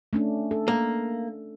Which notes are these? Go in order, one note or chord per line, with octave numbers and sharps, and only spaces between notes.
A3 C#4 D4
A4
A#3